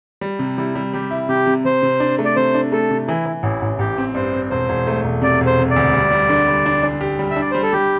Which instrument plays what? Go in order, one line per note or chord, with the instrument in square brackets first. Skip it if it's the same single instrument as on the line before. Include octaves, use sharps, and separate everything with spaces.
[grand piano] G3
C3
[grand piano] G3 [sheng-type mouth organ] E4
[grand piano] G3
[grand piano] G3 [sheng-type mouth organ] G4
[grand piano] E4
[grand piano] C3 [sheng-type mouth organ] G4
[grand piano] C3
[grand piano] C3 [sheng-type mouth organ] C5
[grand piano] C3
D4
A3
[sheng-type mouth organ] D5
[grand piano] C3 [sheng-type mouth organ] C5
[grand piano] D4
[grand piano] A3 [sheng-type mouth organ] A4
[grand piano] C3
[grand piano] E3 [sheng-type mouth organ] E4
[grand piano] E3
[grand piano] A1 [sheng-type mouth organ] E4
[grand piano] A1
[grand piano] A1 [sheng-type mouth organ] G4
[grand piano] C4
[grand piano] G2 [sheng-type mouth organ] C5
[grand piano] C4
[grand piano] E1 [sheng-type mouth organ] C5
[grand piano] E1
A3
E1
[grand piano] C3 [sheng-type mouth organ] D5
[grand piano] E1
[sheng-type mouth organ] C5
[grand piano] C3
[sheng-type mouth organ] D5
[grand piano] D2
G3
G3
D3
G3
D4
D4
G4
G3
[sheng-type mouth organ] E5
[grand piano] D4 [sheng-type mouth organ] D5
[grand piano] G3 [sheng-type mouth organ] C5
[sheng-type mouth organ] A4
[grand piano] G3 [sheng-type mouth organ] G4